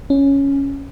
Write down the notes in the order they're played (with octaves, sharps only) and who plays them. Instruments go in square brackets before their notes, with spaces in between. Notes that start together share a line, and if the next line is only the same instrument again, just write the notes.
[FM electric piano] C#4